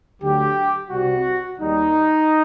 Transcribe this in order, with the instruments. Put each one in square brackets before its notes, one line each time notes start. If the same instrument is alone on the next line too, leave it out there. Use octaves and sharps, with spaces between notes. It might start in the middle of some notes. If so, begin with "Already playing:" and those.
[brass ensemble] D2 D3 F#3 G4
C2 C3 G3 F#4
D#2 D#3 G3 D#4